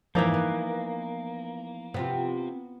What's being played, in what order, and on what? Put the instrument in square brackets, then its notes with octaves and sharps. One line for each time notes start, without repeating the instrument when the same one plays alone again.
[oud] F2 G#2 E5 [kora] E3 D#4 D5 [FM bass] F3 [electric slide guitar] A#3
[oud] B3
[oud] C3 C4 F4 [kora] B3